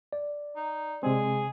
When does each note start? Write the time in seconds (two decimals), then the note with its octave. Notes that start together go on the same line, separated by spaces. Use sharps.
0.13 D5
0.56 D#4
1.03 C3 G#3 C4 G#4